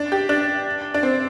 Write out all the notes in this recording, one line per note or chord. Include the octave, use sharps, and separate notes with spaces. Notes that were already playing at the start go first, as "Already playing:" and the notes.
Already playing: D4
G4
D4
D4
C4